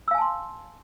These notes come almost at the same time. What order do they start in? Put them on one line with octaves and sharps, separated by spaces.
E6 F5 G#5 A5 C6